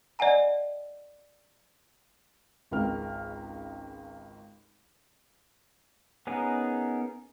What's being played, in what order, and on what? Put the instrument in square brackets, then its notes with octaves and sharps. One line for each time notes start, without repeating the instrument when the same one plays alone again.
[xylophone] D5 D#5 F#5 G#5 A#5
[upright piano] G#1 C#2 G#3 A#4 G5 F6
[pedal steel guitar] B3 C#4 D#4 G#4 A#4